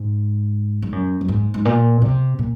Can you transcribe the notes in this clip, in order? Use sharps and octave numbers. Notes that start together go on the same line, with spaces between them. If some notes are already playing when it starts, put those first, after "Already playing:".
Already playing: G#2
G#2
F#2
F#2
G#2
G#2
A#2
C3
A#2